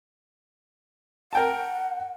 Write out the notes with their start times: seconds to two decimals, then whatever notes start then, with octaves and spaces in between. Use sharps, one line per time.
1.33 A#4 F#5 G5 A5